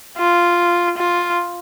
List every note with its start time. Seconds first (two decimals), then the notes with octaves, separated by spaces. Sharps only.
0.18 F4
0.97 F4